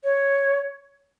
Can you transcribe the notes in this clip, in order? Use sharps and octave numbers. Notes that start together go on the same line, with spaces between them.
C#5